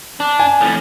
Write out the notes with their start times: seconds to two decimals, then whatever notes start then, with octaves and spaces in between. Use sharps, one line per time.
0.20 D4
0.40 G#5
0.61 F2 A2